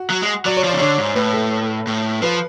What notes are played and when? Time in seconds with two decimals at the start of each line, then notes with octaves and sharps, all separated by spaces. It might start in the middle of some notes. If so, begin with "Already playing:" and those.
Already playing: F#4
0.10 F#3
0.22 G#3
0.45 F#3 D5
0.57 C#5
0.64 F3
0.69 D5
0.73 C#3
0.80 D3 C#5
0.98 G#2
1.15 A2 B4
1.33 A4
1.87 A2
2.22 F3 B4